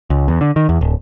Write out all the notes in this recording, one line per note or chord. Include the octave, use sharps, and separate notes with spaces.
C#2
E2
D3
D#3
E2
D1